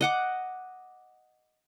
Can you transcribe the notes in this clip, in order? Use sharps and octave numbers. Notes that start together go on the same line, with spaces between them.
D#5 F#5 D6